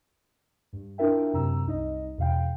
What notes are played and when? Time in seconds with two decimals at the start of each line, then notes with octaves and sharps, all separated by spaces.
0.73 G2
0.98 D4 E4 F4 A#4 E5 G5
1.33 F#2 C3 A#5 E6
1.66 C2 D#4 D#5
2.18 E2 B2 F5 G5